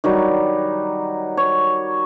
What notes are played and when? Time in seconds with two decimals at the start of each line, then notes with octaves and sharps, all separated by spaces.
0.04 D#3 F#3 G3
1.37 C#5